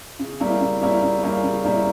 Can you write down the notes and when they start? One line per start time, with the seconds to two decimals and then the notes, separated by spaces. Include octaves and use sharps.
0.19 C#3
0.40 G3 A#3 C#4 E4
0.61 C#3
0.81 G3 A#3 C#4 E4
1.03 C#3
1.23 G3 A#3 C#4 E4
1.43 C#3
1.64 G3 A#3 C#4 E4